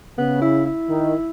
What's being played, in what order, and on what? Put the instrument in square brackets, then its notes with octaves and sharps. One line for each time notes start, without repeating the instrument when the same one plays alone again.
[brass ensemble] C#3 [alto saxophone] B3
[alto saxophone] E4
E4
[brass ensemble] D#3